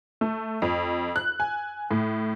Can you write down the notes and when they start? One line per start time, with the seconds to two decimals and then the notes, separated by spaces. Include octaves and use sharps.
0.21 A3
0.62 F2
1.16 F#6
1.40 G#5
1.91 A2